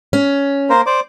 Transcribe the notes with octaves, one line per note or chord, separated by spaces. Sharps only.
C#4
A#3 A#4 C5
C5 D5 D6